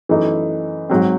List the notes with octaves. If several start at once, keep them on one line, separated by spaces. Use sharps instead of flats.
F#2 E3 A3 D#4
G#2 F#3 C4